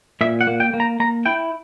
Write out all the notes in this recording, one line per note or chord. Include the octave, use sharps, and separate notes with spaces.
A#2 E5
F#5
A#3
G5
A#3
A#5
A#3 A#5
E4 G5